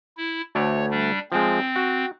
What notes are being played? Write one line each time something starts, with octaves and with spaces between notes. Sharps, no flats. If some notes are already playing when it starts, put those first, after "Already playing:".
E4
D2 A3 C#5 D5
G3 D4
F3 G#3 C4
F#4